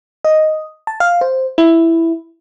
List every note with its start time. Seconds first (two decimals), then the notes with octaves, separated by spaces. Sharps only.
0.25 D#5
0.87 A5
1.00 F5
1.21 C5
1.58 E4